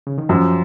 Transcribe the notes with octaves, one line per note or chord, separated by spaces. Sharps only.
C#3
D#3
F#2 F3